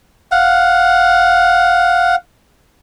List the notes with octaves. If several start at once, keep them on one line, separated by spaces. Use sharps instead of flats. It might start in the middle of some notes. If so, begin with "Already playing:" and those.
F5 F#5